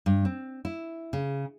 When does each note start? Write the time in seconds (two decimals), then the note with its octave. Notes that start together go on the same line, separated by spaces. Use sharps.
0.06 G2
0.25 C4
0.65 E4
1.13 C#3